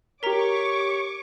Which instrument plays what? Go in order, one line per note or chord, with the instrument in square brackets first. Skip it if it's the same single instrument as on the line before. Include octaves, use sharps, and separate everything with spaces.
[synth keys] G4 B6 [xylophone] A#4 A#5 [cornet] C#5 [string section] C#6 D6